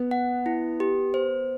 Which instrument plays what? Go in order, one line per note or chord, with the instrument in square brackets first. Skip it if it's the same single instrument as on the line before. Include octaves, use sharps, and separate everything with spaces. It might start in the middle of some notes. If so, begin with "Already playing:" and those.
Already playing: [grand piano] B3
[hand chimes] F#5
E4
G4
C5